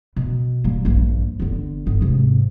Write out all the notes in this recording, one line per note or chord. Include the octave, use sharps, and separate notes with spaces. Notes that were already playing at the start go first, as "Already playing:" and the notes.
B2
G3 A#3
A#1 G2
G1 D3
G1
G#2 C3